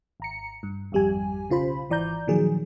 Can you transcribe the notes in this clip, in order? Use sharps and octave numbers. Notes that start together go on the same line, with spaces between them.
G#1 A#5 C#7
G2
G#1 F2 G3 G4 G#5
B1 C#3 F4 C5 B5
G#1 E3 D5 A#5 G6
A#2 D#3 F3 F#3 G#4